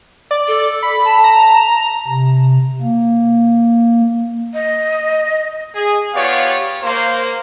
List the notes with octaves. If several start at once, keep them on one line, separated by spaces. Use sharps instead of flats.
D5
A4
B5
A5
A#5
C3
A#3
D#5
G#4
B3 F4 G4 C#5 D5 F5
A#3 C5